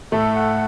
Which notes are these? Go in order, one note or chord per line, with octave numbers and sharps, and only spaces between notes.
A2 A3 A4
F#5